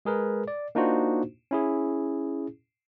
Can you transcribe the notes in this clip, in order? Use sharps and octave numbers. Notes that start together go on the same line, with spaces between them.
G#3 G#4 A#4 B4
D5
A#3 D4 D#4 F4 F#4 C5
C#4 E4 G#4